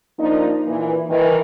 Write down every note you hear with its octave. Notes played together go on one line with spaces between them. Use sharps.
F3 A#3 D4 D#4
A#2 E3
D#3 E3